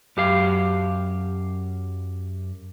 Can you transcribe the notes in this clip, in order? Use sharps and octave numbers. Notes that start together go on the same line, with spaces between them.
F#2 G4 F5